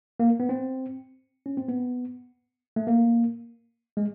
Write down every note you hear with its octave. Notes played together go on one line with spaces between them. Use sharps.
A#3
B3
C4
C#4
C4
B3
A3
A#3
G#3